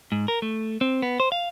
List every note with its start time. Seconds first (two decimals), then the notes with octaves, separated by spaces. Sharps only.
0.12 G#2
0.28 A#4
0.42 A3
0.81 C4
1.02 B3
1.20 C5
1.32 F5